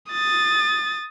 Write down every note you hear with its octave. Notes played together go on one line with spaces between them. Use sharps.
D#6 A6